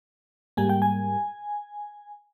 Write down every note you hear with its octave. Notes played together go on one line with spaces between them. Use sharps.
G#2 G3 A#3 G#5
G5
G#5